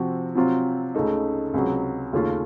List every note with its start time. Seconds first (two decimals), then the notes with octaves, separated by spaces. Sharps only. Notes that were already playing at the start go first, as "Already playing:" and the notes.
Already playing: C3 F3 C4 F#4
0.35 C3 F#3 C4 F4
0.95 C#2 C#3 A3 D#4
1.54 C#2 C3 F#3
2.13 D#2 C#3 A3 C#4 F4